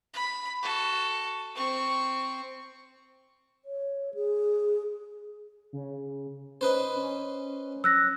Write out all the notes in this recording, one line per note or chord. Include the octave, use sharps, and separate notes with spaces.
B5
F#4 A4
C4 C#6
C#5
G#4
C#3
C#4 D#4 B4 C5
C#4
E6 F#6 A#6